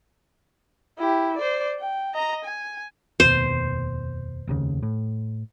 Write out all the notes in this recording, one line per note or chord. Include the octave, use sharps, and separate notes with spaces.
E4 G4
C5 D5
G5
D#5 A#5
G#5
F1 D#2 B2 C5
F1 D#2 C#3
A2